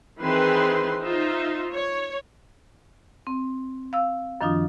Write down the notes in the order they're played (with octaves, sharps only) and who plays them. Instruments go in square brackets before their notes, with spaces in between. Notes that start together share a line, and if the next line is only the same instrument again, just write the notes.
[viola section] D#3 E3 C4 G#4 B4 C6
D#4 F4 C5 E5
C#5
[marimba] C4
F5 E6
F#2 D#3 F3 D4 F4 D#6